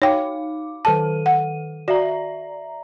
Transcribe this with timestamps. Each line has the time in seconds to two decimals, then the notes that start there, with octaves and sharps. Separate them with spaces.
0.02 D#4 C#5 F5 G5 D6
0.85 D#3 A4 A5 D#7
1.26 F#5
1.88 F#4 D5 E5 A#5